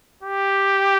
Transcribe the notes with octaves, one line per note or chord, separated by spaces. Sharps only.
G4